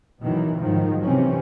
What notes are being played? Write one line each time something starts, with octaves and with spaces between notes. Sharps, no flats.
B2 D#3 E3 F#3
G#2 D#3 F3 F#3
C3 E3 C4 C#4